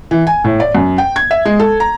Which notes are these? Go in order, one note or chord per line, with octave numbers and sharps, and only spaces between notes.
E3
G#5
A2
D5
F#2
G5
G#6
E5
G#3
A4
A#5